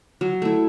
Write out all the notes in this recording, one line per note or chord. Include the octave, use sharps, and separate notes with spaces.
F#3
A3 E4